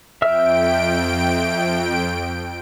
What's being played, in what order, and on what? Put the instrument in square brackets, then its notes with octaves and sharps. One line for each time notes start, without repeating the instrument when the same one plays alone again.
[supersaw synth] F2 G5 D7 [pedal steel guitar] E5 E6 F6